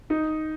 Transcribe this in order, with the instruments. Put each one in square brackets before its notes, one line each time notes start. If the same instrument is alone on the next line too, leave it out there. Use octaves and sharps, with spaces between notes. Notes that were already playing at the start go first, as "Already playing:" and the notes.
[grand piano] D#4